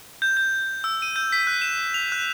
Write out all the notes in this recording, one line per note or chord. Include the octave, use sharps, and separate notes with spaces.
G6
G6
E6
D#7
G6
B6
F#6
E7
F7
F#6